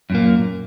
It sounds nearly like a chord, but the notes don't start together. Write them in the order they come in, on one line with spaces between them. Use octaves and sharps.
F#2 A#2 A#3